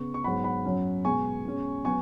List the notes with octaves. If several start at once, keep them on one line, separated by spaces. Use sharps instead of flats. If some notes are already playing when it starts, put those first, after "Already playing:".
Already playing: C#3 B3 C#6
C#6
G#2 F#3 B3 F#5 B5
F#5 B5
F#2 F#3 C#4
B2 G#3 B3 G#5 C#6
B2 G#3 C#4
F#3 B3 G#5 C#6